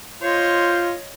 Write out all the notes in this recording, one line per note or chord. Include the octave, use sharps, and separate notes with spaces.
F4 C5 C#5 D#5